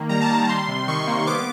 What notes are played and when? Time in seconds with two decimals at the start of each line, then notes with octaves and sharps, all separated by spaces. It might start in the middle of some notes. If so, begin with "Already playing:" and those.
Already playing: D#3 A#3
0.09 G3 A#5
0.21 A5
0.29 D#3 A#5
0.49 G3 C6
0.68 C3
0.88 D#3 C#6
1.07 A#3
1.27 B3 D6